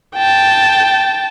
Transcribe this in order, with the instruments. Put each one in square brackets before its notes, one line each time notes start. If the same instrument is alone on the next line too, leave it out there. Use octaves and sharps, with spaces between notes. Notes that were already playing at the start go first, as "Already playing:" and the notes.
[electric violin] G5 A5